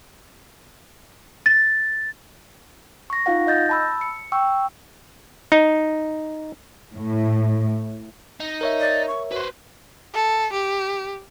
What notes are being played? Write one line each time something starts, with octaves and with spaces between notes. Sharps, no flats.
A6
C#6 A#6
D#4 F4 F5 F#5
D#5 G6 A6 A#6
A5 B5 E6
C#7
G5 C#6 E6
D#4
A2
D#4
A#4 C#5 E5
D5
C#6
F#4 B4 C5
A4
G4